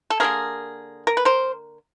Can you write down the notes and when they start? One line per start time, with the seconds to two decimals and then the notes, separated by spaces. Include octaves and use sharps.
0.10 A4
0.20 D3 F3 A#3 G#4 A#4
1.07 A#4
1.17 B4
1.25 A#4 C5